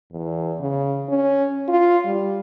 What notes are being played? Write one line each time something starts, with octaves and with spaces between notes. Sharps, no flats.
E2
C#3
C#4
F4
G3